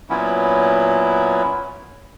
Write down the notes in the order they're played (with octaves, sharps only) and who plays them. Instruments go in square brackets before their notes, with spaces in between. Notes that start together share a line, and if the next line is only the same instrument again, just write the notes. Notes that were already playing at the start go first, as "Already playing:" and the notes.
[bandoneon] A#2 F#3 B3 C#4 E4